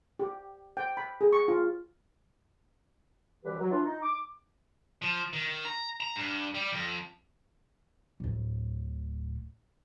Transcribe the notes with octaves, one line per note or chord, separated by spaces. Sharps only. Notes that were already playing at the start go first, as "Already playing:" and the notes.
G4
G5
B5
G#4
C#6
F4
C2 F#2 E3 G3 G4 B4
F#3
E3 D4 F4
D#4
D6
F3
D#3
A#5
A#5
G2
G3
F2
D1 A2